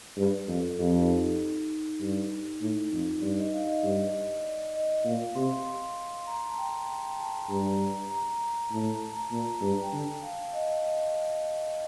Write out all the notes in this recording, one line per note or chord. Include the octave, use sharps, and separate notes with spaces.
G2
F2 A4
F2 G4
D#4
D#4
G2
A2 D#4
F2
G2 D5
D#5
F5
D#5
G2
D5
D#5
A#2 F5
C3 C6
C6
C6
A#5
A5
G5
G5
A5
G2 A#5
A#5
A2 A5
A#5
A#5
A#2
G2
G5
D3 A5
F5
D#5
D#5